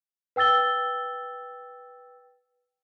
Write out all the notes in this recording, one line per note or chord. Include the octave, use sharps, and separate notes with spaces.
B4 G5 E6 A6 G7